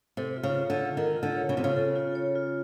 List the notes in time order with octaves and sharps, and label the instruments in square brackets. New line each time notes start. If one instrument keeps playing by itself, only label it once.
[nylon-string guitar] C3 [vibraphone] A4
[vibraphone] F4
[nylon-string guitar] C#3
[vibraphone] C#5
[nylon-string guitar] D3
[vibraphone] F4
[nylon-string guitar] D#3 [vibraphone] A4
[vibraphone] F4
[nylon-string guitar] D3
[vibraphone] C#5
[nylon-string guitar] C#3
[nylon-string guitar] C3 [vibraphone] F4
[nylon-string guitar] C#3
[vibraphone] A4
F4
C#5
F4